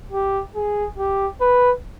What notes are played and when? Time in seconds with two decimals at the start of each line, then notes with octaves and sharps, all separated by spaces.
0.12 G4
0.55 G#4
0.98 G4
1.41 B4